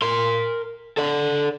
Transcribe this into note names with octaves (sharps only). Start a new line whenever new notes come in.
A#4 C6
A4 D5